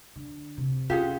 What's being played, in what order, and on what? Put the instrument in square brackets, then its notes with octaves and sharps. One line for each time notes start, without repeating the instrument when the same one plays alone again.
[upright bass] D3
C3
[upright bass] C#4 [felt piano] F4 [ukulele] G4 G#4 F#5